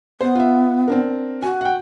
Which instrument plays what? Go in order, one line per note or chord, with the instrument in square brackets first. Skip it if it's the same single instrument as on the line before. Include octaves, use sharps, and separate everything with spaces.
[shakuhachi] B3 [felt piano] C5
[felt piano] F4 E5
C4 D4 A#4
[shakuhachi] F#4 [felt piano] G#5
[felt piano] F#5 G5